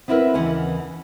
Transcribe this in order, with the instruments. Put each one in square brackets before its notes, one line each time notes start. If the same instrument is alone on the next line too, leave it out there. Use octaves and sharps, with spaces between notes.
[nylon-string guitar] B3 C4 E4 G#4 A#4 B4
D#2 C#3 E3 F#5